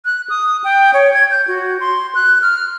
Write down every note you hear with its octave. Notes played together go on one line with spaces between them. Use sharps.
F#6
D#6
G5
C#5
G#6
G6
F#4
C6
F#6
F6